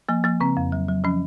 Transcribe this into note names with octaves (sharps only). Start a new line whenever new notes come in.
F3 A#3
F3 A#3
C#3 C4
F2
F#3
F#3
F3 C#4